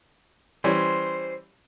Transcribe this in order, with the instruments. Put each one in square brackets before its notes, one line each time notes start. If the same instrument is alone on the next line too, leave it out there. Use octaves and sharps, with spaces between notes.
[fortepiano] E3 G3 C#4 [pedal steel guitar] C5